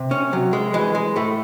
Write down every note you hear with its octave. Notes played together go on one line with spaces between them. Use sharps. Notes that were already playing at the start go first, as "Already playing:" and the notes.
Already playing: C3
C#4
C3 F#3
G#3
E3 G#3
G#3
A2 A3